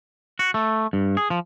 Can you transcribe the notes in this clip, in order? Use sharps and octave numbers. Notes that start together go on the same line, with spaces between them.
F#4
A3
G2
G#4
F3